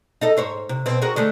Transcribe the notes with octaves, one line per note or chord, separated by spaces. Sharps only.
D#4 A4 D#5
G#2 C5 C#5
C3
B2 C4
F#4 G#4 A#4
D3 G#3 A3